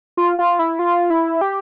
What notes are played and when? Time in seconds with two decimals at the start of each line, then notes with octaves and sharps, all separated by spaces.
0.17 F4
0.39 F4
0.59 E4
0.79 F4
1.10 E4
1.41 G4